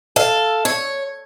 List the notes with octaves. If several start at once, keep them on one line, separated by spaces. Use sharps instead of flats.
A4 F5
C#5